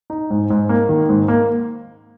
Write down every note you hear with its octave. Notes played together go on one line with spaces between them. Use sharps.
D#4
G#2
G#2
A#3
D#3
G#2
A#3